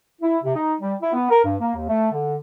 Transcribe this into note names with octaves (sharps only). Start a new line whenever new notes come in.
E4
C3
D#4
G3
E4
B3
A#4
G2
A#3
D#2
A3
D3